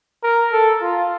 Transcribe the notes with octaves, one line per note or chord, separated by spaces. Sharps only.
A#4
A4
F4